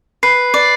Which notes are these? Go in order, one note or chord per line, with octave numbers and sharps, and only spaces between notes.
B4 C7
D5